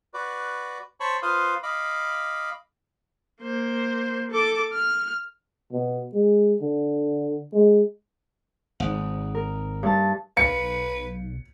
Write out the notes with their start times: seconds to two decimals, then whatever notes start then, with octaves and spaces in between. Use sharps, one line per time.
0.14 F#4 B4 D5
1.00 C5 C#5 A5 B5 C#6
1.22 F4 B4 C5 F5 C6 D#6
1.63 D#5 F5 B5 D6
3.42 A#3 C5
4.31 A4 D6
4.73 F6
5.73 B2
6.14 G#3
6.61 D3
7.53 G#3
8.80 G#1 D#4 F#5
9.35 A#4
9.83 G2 A5
10.37 B1 B4 F5 C#7